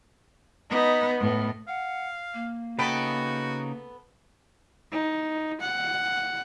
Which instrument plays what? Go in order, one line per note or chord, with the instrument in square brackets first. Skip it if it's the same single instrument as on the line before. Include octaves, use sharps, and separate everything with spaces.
[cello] B3 [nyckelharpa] D#4 B5
[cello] A2 [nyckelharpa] B3
[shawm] F5 [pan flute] F#5
[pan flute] A#3
[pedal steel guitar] C#3 D#4 G5 [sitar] B3 A4 B4 [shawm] F#4
[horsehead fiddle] D#4
F#5